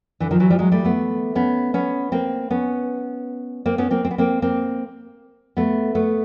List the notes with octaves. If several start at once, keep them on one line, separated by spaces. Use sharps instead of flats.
D3 E3
D#3 F3
E3 F#3
F3 G3
F#3 G#3
G3 A3
A3 B3
B3 C#4
B3 C#4
A#3 C4
B3 C#4
A#3 C4
B3 C#4
A#3 C4
C4
B3
A#3 C4
A#3 C4
A3 B3
A3 B3